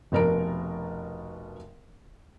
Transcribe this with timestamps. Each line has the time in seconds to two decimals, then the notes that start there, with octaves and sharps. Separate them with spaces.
0.12 F1 B2 D4 A#4 A#5 D7